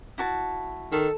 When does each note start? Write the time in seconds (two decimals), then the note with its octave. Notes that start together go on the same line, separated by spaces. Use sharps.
0.18 E4 F#4 A5
0.92 D#3 A4